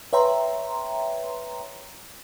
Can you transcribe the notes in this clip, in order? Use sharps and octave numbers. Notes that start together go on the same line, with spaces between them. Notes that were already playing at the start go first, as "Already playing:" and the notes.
B4 C#5 E5 G5 A#5 C6